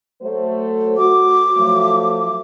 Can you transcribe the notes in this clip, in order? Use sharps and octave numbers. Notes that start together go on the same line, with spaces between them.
F#3 A3 C5
F#4 D6
F3 F#3 A3